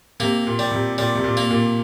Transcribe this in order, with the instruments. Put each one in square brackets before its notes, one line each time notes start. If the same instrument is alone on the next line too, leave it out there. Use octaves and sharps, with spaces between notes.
[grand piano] C3 [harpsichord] A#3
[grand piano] A#2
[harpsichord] G3
[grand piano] C3
[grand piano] A#2 [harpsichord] G3
[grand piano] C3
A#2
[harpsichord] A#3
[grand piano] A#2